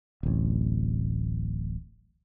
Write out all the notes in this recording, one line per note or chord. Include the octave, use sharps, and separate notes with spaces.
D1 A1